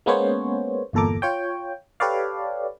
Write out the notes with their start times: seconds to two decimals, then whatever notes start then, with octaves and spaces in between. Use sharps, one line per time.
0.06 G#3 A#3 B3 C#4 C5 C#5
0.93 G1 E2 A#2 A4 A#5 D6
1.22 F4 C#5 G5
2.00 G4 A4 B4 C#5 D5 F5